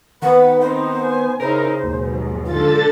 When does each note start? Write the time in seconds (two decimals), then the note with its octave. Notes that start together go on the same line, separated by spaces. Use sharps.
0.22 D#3 B3 B4 F#5
0.61 C4 D#4 C5
1.04 G#5
1.40 C#3 D#4 E4 A#4 C5
1.83 D#2 G#2 B2 F#3
2.45 D3 F4 A4 A6